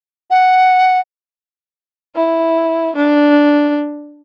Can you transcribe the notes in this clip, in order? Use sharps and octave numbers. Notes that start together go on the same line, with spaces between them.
F#5
E4
D4